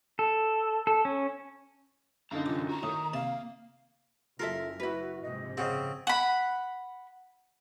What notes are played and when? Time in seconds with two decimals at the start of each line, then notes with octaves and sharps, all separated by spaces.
0.19 A4
0.87 A4
1.05 C#4
2.31 F#2 D3 D#4 F5 A#5
2.46 C3 E3 F4 D6
2.69 D#4 F#4 A#5
2.83 A2 D#3 D#4 D#6
3.13 C3 A#3 F5 A5
4.39 F#1 F4 A4 A#4 E5
4.80 E4 F#4 B4
5.22 A#1 G#2 C3 D#5
5.57 C#3 C4 G#4 F#5
6.07 F#5 B5